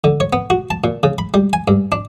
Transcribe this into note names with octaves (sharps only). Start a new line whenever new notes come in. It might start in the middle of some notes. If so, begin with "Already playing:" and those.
D3
C#5
B3
F#4
A5
A#2
C#3
B5
G3
G#5
G2
D4